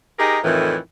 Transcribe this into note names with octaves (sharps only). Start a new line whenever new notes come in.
D#4 G4 G#4 A#4 D#5
F2 A2 D#3 E3